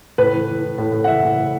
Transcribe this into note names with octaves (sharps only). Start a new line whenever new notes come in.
A2 B4
E3
E3
E3
A2
A2
F#5
E3 E5
A2
A2